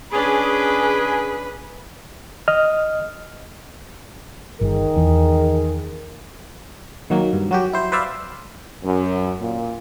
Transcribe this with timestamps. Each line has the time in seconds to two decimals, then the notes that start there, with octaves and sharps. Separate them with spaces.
0.12 C#4 D4 G#4 B4
2.48 D#5 F6
4.61 G1 D#3 G#4 A#4
4.97 E2
7.10 D#3 F#3 A#3
7.33 G2
7.51 F#3 F#4 G4
7.73 E4 C5
7.92 B4 C5 D5 E5 F5
8.84 F#2
9.40 A#2